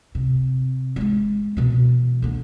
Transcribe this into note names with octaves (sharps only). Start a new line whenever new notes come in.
C3
G#3 A3
B2 E3
D3 A#3